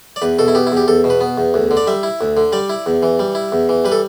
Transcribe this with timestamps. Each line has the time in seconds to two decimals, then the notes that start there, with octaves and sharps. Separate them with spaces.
0.16 D5
0.22 E2 B4
0.39 B2 A4
0.48 E4
0.55 B3 G4
0.67 E4
0.72 E2 G4
0.88 E2 A4
1.04 B2
1.10 B4
1.21 B3
1.38 E2
1.54 D2
1.71 D3
1.77 D5
1.87 G3 E5
2.03 E4
2.21 D2
2.37 D3
2.53 G3 D5
2.69 E4
2.86 E2
3.03 E3
3.19 G3
3.35 E4
3.52 E2
3.69 E3
3.85 G3 B4
3.92 A4